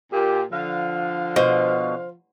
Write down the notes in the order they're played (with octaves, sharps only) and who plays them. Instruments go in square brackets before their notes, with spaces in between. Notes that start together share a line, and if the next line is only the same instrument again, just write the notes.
[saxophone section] A#2 [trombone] G4
[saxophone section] D3 F5 [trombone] F3
[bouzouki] B2 [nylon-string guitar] C5